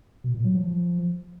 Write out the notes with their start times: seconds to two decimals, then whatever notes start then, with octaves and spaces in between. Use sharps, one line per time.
0.24 B2
0.34 A#2
0.44 F#3
0.54 F3